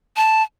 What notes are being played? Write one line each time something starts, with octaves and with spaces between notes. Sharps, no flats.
A5